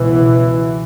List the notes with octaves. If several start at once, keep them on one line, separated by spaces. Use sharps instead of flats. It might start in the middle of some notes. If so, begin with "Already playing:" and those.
Already playing: C#2 B2 E3